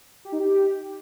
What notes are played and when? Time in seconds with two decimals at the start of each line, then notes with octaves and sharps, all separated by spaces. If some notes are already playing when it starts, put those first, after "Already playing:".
0.25 G4
0.32 D#4
0.40 G4